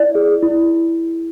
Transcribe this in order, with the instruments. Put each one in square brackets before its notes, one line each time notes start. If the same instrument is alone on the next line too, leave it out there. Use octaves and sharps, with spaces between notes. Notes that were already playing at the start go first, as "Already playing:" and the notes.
Already playing: [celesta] E4 D5
G#4
E4